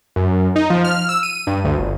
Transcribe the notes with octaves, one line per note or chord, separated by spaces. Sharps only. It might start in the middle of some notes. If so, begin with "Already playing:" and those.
F#2
D#4
F3
F6
E6
D#7
G2
D2
G1